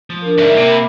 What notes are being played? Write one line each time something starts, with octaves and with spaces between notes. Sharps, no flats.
F3
D4 A#4
D2 G#2 A#4 D5 E5
C3 A#3
B5